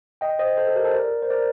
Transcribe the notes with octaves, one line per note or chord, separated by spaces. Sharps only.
D#5 G5
C5 D#5
A4 C5
A4
G4 A#4
A4 C5
A#4 D5
C5
A#4 D5